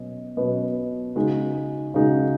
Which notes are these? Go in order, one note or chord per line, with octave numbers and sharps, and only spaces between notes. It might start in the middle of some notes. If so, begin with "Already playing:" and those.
Already playing: B2 F#3 C#4 D#5
B2 F#3 C#4 B4 D#5
C#3 G#3 D#4 F#4
C#3 G#3 D#4 F#4